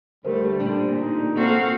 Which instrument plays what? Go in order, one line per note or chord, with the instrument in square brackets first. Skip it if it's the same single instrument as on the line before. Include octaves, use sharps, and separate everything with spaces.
[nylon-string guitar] D2 [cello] D3 A3 [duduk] G3 [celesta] G4 A#4 C5
[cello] A#2 [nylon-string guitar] D3 C4 D4
[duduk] D#4
[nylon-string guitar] A#3 A4 C5 [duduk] C4 [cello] F#4 F5